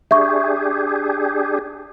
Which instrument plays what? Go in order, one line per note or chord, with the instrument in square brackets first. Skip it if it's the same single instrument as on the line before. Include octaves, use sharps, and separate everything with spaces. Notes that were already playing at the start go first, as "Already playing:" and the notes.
[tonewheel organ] D4 G4 G#4 [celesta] E5 C#6